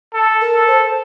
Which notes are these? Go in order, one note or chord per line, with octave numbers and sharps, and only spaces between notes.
A4
A#4
A4
C5